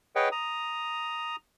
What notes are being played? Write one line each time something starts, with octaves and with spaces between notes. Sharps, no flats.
G#4 B4 C#5 D#5 F#5 G5
A#5 D#6